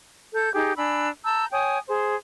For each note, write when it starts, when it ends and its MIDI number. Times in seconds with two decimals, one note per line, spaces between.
0.34 0.52 69
0.34 0.52 91
0.54 0.73 63
0.54 0.73 67
0.54 0.73 68
0.77 1.07 62
0.77 1.07 80
0.77 1.07 83
0.77 1.07 88
1.24 1.46 81
1.24 1.46 82
1.24 1.46 88
1.24 1.46 91
1.51 1.78 73
1.51 1.78 79
1.51 1.78 80
1.51 1.78 87
1.88 2.14 68
1.88 2.14 72